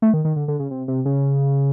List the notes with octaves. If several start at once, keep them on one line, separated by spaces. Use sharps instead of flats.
A3
D#3
D#3
D3
D3
C#3
C3
C3
C#3